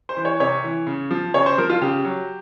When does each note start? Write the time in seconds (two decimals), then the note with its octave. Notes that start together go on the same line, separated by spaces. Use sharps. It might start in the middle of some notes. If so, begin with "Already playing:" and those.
0.09 C5
0.17 E3
0.25 C#5
0.40 C3 C#5
0.64 E3
0.87 C#3
1.11 F3
1.34 C#3 C#5
1.46 C5
1.58 F3 A#4
1.69 F4
1.81 C#3 G4
2.04 F#3